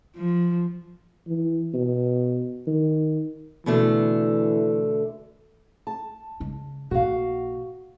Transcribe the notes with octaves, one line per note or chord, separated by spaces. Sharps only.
F3
E3
B2
D#3
B2 D3 E3 A3
A5
C#3 G#3
A#1 A#2 F#4 F5